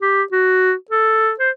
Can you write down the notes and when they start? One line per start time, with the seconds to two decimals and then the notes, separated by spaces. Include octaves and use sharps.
0.02 G4
0.32 F#4
0.91 A4
1.40 C5